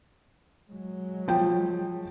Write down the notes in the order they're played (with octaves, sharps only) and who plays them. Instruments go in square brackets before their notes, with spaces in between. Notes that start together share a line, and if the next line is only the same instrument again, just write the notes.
[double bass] F#3 G#3
[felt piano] F3 G5